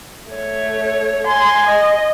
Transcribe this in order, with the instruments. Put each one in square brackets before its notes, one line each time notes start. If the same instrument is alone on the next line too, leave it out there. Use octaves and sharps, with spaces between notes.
[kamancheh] A3 C#5
[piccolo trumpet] G#5 [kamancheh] C6
[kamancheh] D#5